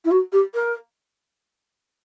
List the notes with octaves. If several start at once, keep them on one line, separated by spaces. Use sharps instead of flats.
E4
F#4
G4
A#4